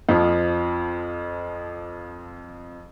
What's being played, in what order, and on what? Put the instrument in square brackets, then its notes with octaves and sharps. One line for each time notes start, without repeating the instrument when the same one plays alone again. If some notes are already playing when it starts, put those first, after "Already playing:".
[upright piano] F2 F3